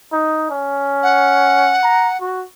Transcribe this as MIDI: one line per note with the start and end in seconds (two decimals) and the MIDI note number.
0.12 0.48 63
0.50 1.78 61
1.03 2.17 78
1.83 2.09 82
2.21 2.43 66